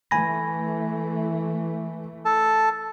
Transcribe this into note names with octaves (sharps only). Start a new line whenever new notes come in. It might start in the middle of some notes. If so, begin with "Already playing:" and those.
E3 A3 G#5 B5 A#6
A4 A5